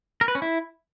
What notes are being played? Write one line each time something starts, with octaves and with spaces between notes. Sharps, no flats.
A#4
B4
C#4
E4